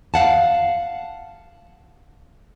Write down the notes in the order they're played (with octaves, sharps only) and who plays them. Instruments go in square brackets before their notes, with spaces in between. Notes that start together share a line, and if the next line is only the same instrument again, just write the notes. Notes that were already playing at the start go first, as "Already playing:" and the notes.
[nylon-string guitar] F5 F#5 A5